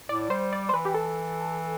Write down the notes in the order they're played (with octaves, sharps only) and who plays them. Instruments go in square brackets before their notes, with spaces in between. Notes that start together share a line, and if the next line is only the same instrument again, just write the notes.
[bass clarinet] A2 [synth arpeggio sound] D5
[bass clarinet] G3 [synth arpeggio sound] C5
[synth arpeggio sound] D5
C5
[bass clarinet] E3 [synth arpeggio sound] B4
[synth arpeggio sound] G4
A4